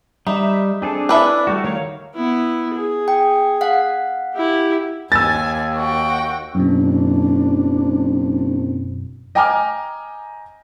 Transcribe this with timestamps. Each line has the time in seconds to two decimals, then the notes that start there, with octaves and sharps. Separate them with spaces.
0.27 G3 D#4 E5
0.82 C4 D4 G#4 A4
1.09 D4 E4 B4 E5
1.47 G3 A3 F#4
1.64 D#3 A#4 C#5 F5
2.15 B3 E4
2.74 G#4
3.08 G5
3.61 F5 F#5
4.34 E4 G4
5.12 D#2 G#5 E6 A6
5.77 F#4 G5
6.55 F#1 F#2 B2 C4 D4
9.35 D#5 G5 G#5 A#5 D6 F6